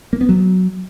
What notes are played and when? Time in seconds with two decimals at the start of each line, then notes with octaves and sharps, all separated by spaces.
0.13 A#3
0.21 B3
0.29 F#3